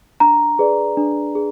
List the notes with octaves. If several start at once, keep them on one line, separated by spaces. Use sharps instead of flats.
D4 A#5
G#4 B4 D5
D4
G#4